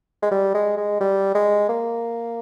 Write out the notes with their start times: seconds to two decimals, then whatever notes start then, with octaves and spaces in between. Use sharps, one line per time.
0.22 G#3
0.31 G3
0.54 G#3
0.77 G#3
1.00 G3
1.35 G#3
1.69 A#3